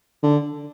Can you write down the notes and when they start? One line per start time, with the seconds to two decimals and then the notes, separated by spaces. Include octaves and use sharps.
0.23 D3